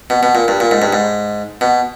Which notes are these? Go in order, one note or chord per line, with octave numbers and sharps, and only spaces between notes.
B2
B2
A#2
G2
A#2
G#2
G2
G#2
B2